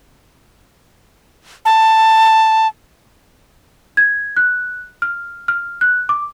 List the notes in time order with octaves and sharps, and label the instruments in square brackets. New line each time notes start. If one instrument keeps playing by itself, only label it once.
[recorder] A5
[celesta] G#6
F#6
F6
F6
F#6
D6